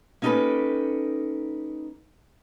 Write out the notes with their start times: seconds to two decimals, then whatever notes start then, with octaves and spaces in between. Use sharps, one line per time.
0.22 A#3 C#4 D#4 G4 A4 B4